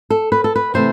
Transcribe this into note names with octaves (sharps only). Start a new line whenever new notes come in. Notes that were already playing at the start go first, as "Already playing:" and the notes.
A4
B4
A4
B4
C3 E3 A3 E4 C5